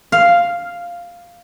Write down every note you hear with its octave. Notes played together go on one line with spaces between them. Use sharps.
F5